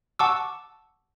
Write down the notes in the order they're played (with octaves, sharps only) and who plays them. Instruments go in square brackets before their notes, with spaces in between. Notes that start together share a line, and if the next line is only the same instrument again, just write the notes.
[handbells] F#5 A5 C#6 D6 E6